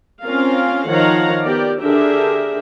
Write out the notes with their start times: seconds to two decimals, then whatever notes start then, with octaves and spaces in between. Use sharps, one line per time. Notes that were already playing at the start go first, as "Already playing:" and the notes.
0.24 C4 C#4 F4 A#4 F5
0.88 D#3 F3 C#5 F5 F#5 A#5
1.43 B3 G4 A#4 D5
1.80 D3 D4 G4 G#4 A#4 E5